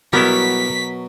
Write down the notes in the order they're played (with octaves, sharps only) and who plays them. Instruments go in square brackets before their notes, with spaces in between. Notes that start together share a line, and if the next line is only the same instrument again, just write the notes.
[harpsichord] B2 [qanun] F#3 A#4 B5 [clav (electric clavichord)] G3 B3 E4 [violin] B6